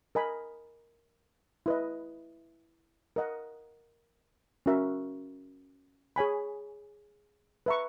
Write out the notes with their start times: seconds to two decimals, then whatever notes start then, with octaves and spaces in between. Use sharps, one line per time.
0.15 A#4 D#5 G#5 B5
1.66 E4 B4 D#5
3.16 A#4 D#5 F#5
4.66 C#4 F#4 A#4 E5
6.16 G#4 C#5 G#5 B5
7.66 B4 E5 A#5 C#6